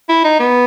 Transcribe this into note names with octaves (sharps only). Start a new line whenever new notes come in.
E4
D#4
B3